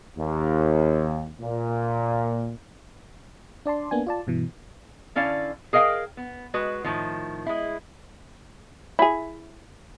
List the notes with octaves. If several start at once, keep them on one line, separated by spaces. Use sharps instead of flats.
D#2
A#2
D4 D5 A5 C6
A#3 B3 D4 G#5
F4 D5 A5
G2 B2 E3
D3 C#4 E4 D5 F5
G#4 A#4 D#5 F5 G5
B3
G#3 F#4 B4
A2 D#3 F3
G#3 E4
E4 G#4